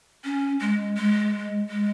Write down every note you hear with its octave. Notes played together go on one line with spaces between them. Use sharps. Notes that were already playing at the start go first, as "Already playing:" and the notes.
C#4
G#3
G#3
G#3